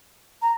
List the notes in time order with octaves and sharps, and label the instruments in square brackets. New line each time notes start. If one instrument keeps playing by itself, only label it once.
[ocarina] A#5